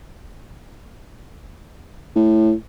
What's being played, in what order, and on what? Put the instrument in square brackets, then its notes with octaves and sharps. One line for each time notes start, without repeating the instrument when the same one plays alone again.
[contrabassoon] A2